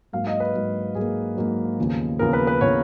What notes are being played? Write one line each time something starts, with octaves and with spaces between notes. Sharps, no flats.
G#2 F#3 A#3 F5
D#5
B4
G#2 F#3 A#3
G#2 F#3 A#3 G#4
G#2 F#3 A#3
D#2 C#3 F3 B3
D#2 C#3 F3 B3 A#4
B4
B4
C#3 F3 B3 C#5